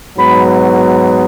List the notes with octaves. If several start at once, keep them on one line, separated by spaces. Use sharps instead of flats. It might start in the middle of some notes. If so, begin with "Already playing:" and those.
G#2 F#3 B3 B5